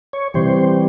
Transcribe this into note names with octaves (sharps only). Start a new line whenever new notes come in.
C#5
C3 E3 G3 C5